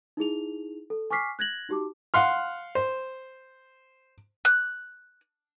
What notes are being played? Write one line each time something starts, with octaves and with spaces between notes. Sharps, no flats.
D#4 E4 G#4 F7
A4
G#5 C#6 D6 F6 B6 C7
F#6 G#6 A#6 F#7
D#4 F#4 G4 A5 D6
F5 F#5 C6 F6
C5
F#6